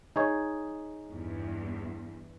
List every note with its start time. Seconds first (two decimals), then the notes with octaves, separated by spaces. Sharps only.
0.16 D#4 G#4 C#5
1.08 E2 G2